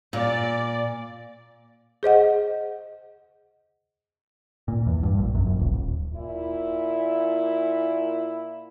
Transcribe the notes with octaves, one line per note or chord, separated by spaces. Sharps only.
A#2 D5
G#4 C5 D#5 F#5
A#2
E2
G2
A#1
F#2
A#1
D#1
D#1
A#2 E4